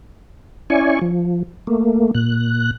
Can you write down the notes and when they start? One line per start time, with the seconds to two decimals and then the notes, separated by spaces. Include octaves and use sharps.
0.70 C#4 E4 D5 G#5 C#6
1.01 F3
1.67 A3 A#3
2.14 A#2 F#6